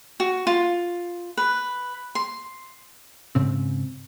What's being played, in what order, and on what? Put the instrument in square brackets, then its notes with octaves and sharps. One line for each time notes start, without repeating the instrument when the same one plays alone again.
[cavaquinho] F#4
F4
B4
C6
[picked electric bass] G#2 C#3 C4